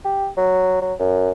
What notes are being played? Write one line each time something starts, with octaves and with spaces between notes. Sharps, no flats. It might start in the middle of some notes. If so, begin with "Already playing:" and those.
G4
F#3
F#3
F#2